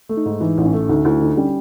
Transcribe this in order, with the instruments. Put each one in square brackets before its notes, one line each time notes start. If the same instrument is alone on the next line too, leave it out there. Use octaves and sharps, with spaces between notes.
[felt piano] A3
[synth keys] D#4
[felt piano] G#2
[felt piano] E3 [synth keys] D#4
[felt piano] A1
[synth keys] C#4
[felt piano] A3
[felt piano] D2 [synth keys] D#4
[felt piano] D2 [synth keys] E4
[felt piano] D3 [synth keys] D#4
[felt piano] G3 [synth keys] C#4